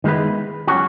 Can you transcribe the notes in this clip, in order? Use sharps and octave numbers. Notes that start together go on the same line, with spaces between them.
D#3 G#3 B3 E4 B4
F#3 C#4 F#4